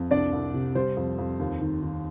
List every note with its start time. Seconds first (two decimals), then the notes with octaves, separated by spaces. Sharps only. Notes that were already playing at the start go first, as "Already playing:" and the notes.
Already playing: F2
0.11 C2 D4 D5
0.33 C2
0.54 C3
0.75 G3 C5
0.97 F2
1.18 F2
1.40 D#2
1.61 D#3
1.82 D#3